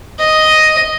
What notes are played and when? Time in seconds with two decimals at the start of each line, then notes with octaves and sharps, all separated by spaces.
0.20 D#5